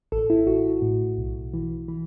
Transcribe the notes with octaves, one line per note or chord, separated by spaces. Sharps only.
A1 A4
E4
A1 F#4
A2
B1
E3
E3